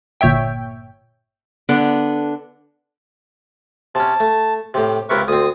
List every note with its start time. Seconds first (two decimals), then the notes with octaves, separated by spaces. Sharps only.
0.21 G1 A#2 C#5 E5 G5
1.69 D3 B3 D4 A4
3.95 C3 C#4 A5
4.20 A3
4.74 A2 C3 G4
5.09 C#2 C3 A#4 B4 E5 C#6
5.28 D2 C4 D#6